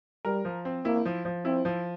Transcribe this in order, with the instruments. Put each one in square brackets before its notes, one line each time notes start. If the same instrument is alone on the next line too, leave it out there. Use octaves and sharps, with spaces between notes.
[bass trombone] G3 [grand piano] A#4
[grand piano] F3
C4
[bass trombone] A#3 [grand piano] E4
[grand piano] F3
F3
[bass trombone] C4 [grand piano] E4
[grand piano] F3